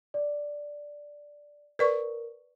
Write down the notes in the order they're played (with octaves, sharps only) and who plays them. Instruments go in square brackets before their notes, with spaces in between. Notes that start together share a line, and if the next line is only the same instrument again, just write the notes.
[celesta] D5
[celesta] A#4 [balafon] B4 D5 C#6